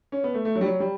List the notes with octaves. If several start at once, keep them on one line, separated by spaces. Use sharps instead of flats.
C#4
B3
A3
A3
F#3
G3
F#3
G3